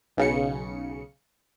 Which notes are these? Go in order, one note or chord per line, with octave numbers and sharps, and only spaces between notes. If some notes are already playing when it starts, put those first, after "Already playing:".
B1 C#3 C#7